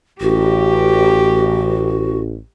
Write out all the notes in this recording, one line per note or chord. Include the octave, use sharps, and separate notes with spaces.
A1 F#4 G4